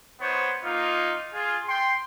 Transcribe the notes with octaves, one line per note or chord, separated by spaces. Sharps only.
B3 D#4 C5 C#5
A#3 D#4 F4
F4 G#4
G5 C6